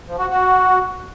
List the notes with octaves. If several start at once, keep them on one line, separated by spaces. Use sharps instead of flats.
F3
F#4
F#4